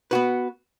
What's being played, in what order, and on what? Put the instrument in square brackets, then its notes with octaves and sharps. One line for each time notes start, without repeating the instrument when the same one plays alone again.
[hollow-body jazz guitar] B3 F#4 B4